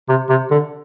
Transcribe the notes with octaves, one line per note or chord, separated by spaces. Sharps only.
C3
C3
D3